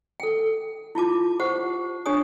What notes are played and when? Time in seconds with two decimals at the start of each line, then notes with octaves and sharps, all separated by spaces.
0.20 A4 G5
0.95 E4 F4 A5 D6
1.40 G4 C5 F#5
2.06 D4 G4 C#5 G#5 D#6